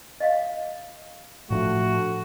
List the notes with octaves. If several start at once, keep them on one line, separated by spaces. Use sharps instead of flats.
D#5 F5
A2 F3 A3 D4 F#4